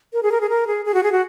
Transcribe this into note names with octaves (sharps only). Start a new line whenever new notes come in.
A#4
G#4
A#4
G#4
A#4
G#4
G#4
F#4
G#4
F#4